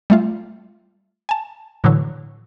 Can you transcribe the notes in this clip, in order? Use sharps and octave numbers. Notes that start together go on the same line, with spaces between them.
G3 A3 F4
G#5 A5
A2 D3 E3 F#3